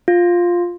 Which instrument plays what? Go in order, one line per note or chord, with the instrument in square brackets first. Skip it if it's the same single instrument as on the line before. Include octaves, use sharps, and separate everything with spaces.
[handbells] F4